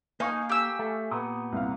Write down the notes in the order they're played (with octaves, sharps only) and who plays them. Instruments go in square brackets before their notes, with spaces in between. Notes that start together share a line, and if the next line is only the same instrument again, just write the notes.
[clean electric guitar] A#3 [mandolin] D#4 [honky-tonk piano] F5 G#5 C#6
[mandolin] G4 E6
[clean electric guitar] A3
[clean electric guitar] A#2 B3 [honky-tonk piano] D#6
[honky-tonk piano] C2 F5